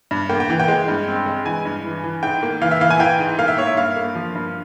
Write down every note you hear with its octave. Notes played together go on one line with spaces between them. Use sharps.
G2
A#3 G5
G5
E3
G5
G#3
G2
C4
G#3
E3 G#5
G2
E3
E3
G#2 G5
A#3
E3 F5
E5
E3 F5
G#5
E3 G5
G#2
A#3 F5
E5
A#3 C#5
E5
G2 F5
A#3
F3
G2